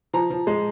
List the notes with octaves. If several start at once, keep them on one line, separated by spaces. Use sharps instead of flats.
F3 A#5
F3
G#3